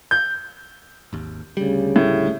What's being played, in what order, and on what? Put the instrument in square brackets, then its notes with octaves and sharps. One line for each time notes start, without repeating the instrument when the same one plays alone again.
[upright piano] G6
[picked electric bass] G#1 D#2
[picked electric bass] D2 G3 [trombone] C#3
[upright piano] A2